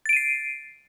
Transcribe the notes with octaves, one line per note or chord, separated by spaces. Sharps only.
A6 C7 D7 D#7